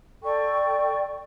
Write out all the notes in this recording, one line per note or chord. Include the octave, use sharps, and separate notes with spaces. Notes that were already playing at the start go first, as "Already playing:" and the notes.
A4 D5 G5 C#6